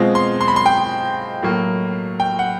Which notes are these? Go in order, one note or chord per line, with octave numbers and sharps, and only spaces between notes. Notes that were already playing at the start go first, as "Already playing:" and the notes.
Already playing: B2 G#3 C4 F4
C6
C6
B5
C6
G5
A2 F#3 A#3
G5
F#5